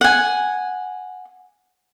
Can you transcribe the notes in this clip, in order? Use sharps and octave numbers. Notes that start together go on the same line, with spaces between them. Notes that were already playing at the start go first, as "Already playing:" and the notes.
F#5 G#5